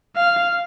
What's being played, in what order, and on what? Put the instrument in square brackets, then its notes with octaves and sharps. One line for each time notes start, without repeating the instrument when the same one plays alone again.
[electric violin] F5